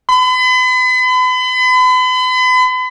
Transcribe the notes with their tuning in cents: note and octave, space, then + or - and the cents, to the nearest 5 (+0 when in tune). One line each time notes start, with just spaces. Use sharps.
B5 +40